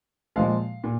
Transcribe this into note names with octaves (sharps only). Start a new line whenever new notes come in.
A#2 F3 G#3 F5
A#2